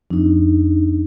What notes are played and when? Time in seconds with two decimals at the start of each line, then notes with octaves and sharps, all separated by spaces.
0.10 F2 D4 D#4